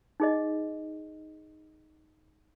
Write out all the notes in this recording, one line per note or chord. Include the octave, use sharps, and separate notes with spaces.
D#4 G#4 D#5